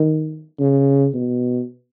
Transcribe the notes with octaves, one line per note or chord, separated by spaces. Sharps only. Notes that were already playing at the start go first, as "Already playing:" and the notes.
Already playing: D#3
C#3
B2